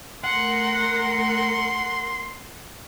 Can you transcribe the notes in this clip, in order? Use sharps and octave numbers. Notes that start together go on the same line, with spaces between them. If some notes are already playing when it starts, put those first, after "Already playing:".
A3 A#4 F#5 C6